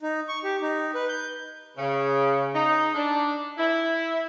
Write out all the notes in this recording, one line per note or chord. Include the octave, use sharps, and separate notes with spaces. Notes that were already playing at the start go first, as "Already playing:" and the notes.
D#4
C#6
G4
D#4
B4
G6
C#3
D#4
D4
E4